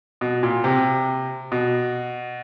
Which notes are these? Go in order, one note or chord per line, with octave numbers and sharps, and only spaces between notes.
B2
A#2
C3
B2